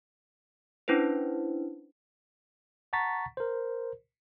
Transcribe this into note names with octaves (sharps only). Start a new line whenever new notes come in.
C#4 D4 E4 B4 C5
F#5 A5 A#5 C#6 A6 B6
A#4 C5